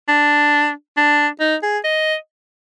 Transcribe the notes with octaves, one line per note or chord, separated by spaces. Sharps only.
D4
D4
D#4
G#4
D#5